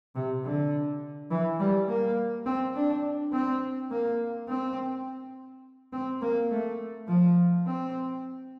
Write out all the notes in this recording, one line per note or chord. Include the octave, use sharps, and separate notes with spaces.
C3
D3
E3
G3
A#3
C4
D4
C4
A#3
C4
C4
A#3
A3
F3
C4